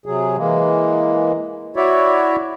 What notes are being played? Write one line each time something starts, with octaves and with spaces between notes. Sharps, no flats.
C3 F#3 G#4
E3 G#3 A#3
E4 F#4 C#5 D5 E5